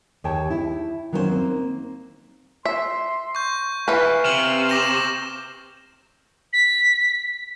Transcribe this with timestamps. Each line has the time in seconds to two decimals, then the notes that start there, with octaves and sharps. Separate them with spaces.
0.24 D#2 G4 G#4 C#5 G5 A5
0.50 E4
1.13 D#3 F#3 A#3 C#4 A#4 C5
1.29 A#3 C4
2.65 E5 C6
3.35 C#6 G6
3.88 E3 B4 F5
4.25 C3 F6 F#7
4.69 C4 D6 A#6 E7
6.53 B6